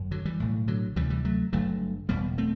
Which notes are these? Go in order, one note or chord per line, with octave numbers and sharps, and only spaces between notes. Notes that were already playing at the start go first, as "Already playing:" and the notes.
Already playing: G1 F#2
D3 F#3
E3 G3
B1 A2
D3 F#3
D2 C3 E3 G3
E3 G3
F#3 A3
G1 G2 D3 F#3 A3
F#1 E2 B2 G3 B3
A3 C4